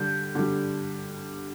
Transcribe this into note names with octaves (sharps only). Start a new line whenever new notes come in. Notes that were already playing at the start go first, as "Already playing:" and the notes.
Already playing: D3 G3 G6
D3 G3